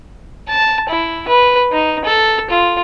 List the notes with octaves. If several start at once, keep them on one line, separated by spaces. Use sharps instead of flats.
A5
E4
B4
D#4
A4
F4